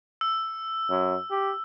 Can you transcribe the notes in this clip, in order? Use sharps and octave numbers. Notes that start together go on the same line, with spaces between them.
E6
F#2
G4